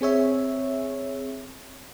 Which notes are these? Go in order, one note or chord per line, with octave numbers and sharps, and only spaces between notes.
C4 G#4 C#5 E5